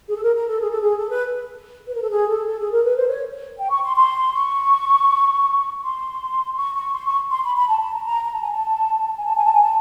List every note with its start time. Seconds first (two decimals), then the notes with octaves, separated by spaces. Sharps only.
0.09 G#4
0.16 A4
0.23 A#4
0.35 A#4
0.48 A4
0.60 G#4
0.70 A4
0.81 G#4
0.98 A4
1.10 B4
1.88 B4
1.95 A#4
2.02 A4
2.10 G#4
2.28 A4
2.47 A4
2.59 G#4
2.72 A#4
2.84 B4
2.97 C5
3.08 C#5
3.59 G5
3.71 C#6
3.84 C6
3.96 C6
4.33 C#6
5.82 C6
6.56 C#6
6.75 C#6
6.94 C6
7.06 C#6
7.31 C6
7.44 B5
7.56 B5
7.69 A5
7.81 A5
7.93 A#5
8.05 A#5
8.24 A#5
8.33 A5
8.42 G#5
8.52 A5
9.18 G#5
9.27 A5
9.36 G#5
9.45 A5
9.54 G#5
9.63 A5